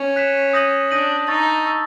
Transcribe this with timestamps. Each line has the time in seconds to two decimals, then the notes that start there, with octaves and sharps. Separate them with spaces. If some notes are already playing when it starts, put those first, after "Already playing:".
Already playing: C#4
0.16 F#6 B6 E7
0.53 D#6 G6 A#6 D#7 F#7
0.91 D4 D#6 G6 A#6 D#7 F#7
1.28 D#4 A5 C#6 E6 A6
1.66 A5 C#6 E6 A6